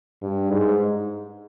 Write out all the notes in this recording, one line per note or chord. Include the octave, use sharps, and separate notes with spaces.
G2
G#2